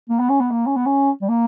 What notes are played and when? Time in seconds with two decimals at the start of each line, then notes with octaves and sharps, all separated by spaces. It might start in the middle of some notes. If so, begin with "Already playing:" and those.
0.09 A#3
0.19 B3
0.29 C#4
0.40 B3
0.51 A#3
0.67 C#4
0.76 B3
0.86 C#4
1.21 G3
1.29 A#3